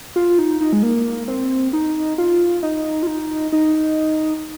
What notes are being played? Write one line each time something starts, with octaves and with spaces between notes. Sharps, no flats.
F4
D#4
D#4
G#3
A#3
C4
D#4
F4
D#4
F4
D#4
D#4